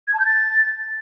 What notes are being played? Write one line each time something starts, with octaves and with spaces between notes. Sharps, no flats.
G#6
A5
G6
A6